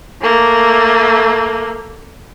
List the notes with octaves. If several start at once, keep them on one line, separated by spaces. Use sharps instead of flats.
A3 A#3